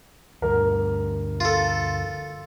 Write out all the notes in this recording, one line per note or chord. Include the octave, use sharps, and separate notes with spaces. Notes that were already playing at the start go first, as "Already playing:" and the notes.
D2 G2 D3 A#4
F4 A4